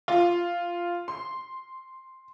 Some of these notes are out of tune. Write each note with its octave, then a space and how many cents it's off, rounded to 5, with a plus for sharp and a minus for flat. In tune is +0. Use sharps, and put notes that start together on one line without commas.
F4 -5
C6 +0